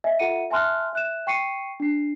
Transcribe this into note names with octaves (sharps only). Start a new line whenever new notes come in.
D#5 E5 G#5
F4 A4 E5 F#5 C#7 D#7
E5 G#5 A5 C6 F6 F#6
E5 F#6 E7
G5 C#6 C7 C#7 D#7
D4 C7